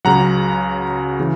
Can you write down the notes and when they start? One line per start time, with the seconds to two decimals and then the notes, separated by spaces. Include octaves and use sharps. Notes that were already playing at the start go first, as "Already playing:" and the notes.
0.05 C#2 C#3 F#3 F#5 A#5
1.20 C#3 E3